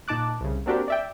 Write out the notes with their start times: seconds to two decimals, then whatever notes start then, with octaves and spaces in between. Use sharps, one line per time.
0.08 A#2 D#4 A5 D6 F#6
0.40 C2 C#3
0.66 A#3 C4 D4 F#4 G4 A#4
0.88 D5 E5 G5